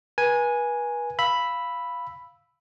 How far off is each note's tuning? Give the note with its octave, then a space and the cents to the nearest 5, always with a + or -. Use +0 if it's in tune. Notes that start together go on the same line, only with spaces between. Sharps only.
B4 -35 G#5 +0
F5 -5 B5 +0 E6 +0